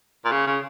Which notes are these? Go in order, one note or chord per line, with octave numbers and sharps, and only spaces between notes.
A#2
C#3
C#3